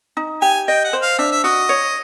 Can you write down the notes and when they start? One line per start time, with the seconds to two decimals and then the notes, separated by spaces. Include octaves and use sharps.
0.17 D#4
0.42 G4 G#5
0.68 D#5 G5
0.84 F#5
0.93 C5
1.02 F5
1.18 D4 E5
1.32 E5
1.44 F#4 D#5
1.69 C#5